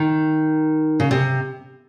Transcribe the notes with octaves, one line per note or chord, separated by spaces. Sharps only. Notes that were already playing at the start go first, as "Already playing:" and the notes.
Already playing: D#3
C#3
C3